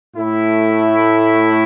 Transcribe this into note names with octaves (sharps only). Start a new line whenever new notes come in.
A2 A3 E4